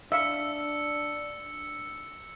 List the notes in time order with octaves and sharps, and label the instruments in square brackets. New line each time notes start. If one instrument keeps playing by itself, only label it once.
[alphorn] D4 [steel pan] E5 F5 [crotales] E6 C#7